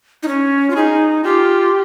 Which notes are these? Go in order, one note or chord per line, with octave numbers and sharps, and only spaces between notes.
D#4
C#4
F4
D#4 G#4
F4 G4